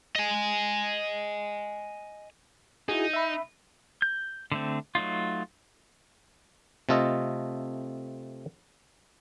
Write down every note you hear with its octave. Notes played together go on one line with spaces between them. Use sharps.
D#5 G#5
D#4 E4 F#4 G#4
E5 B5
G6
D3 A3 C4
F#3 A3 D#4 F4
C3 A3 F4 A4 D#5